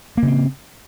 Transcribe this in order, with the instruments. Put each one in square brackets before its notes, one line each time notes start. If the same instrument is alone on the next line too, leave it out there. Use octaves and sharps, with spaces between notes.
[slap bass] A#3
C#3
C4